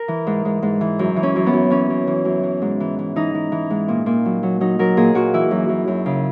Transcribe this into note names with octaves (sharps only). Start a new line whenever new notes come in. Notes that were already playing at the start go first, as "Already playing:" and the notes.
Already playing: A#4
E3
G#2
G#2
G#2
E3
F#2
E3
C#4
F#2
B3
F#2
E3 C#4
F#2
E3
F#2
E3
G#2
E3
E3
E3 D#4
E3
E3
G#2
A#2
A#2
F#3
F#3
F#3 D#4
F#3 A#4
A#2 G#4
A#2 F#4
E3 E4
F#2
F#2
F#2
C#3